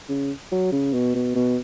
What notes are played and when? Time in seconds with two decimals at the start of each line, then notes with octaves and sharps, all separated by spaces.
0.09 C#3
0.52 F#3
0.72 C#3
0.93 B2
1.15 B2
1.35 B2